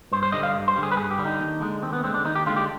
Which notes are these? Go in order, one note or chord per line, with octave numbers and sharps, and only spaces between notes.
G2 C5
C5
D3 G3 D#5
F5
G2
C5
D3 G3
G#4
B4
G2 G#4
G4
D3 G3
D#4
D#2
D3 G#3
D#2 C4
B3
D3 G#3 C4
D4
D#2 D#4
G4
D3 G#3 F4
G4